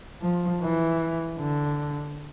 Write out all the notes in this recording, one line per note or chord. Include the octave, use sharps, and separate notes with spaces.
F3
E3
D3